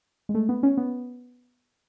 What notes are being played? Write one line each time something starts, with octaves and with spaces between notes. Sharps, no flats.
G#3
A3
B3
C#4
B3